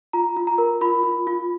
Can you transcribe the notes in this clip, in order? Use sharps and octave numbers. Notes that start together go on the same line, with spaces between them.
F4 A#5
F4
A#5
A#4
F4 B5
F4
F4